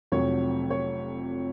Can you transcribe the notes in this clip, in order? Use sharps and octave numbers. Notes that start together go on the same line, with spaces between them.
F1 F2 C3 F#3 C#5
C#5